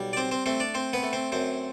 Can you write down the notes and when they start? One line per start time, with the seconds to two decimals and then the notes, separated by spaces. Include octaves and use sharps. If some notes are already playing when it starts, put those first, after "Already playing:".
Already playing: B1 G3
0.13 D5
0.17 C4 C5
0.31 C4 C5
0.46 A3 C4 C5
0.60 D4 D5
0.74 C4 C5
0.93 B3 B4
1.03 A3
1.13 C4 C5
1.32 F#2 C4 C5